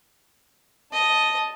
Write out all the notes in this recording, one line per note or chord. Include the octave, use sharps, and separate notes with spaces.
D#5 A5